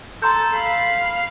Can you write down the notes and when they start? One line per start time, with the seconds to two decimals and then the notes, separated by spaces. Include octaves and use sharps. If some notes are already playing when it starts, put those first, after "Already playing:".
0.22 A4 A#5 C6 G6
0.54 F5 B5